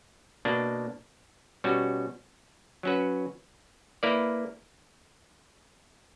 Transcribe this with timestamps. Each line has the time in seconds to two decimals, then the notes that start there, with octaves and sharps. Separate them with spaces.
0.45 B2 A#3 D4
1.64 B2 G3 C#4 F#4
2.83 F#3 C#4 F#4 B4
4.03 A#3 E4 B4 D5